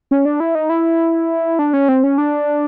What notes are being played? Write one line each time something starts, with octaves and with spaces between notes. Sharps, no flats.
C#4
D4
E4
D#4
E4
D4
C#4
C4
C#4
D4